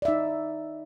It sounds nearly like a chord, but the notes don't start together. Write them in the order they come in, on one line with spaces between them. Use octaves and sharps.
D5 E5 D#4